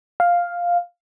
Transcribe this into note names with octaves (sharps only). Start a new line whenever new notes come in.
F5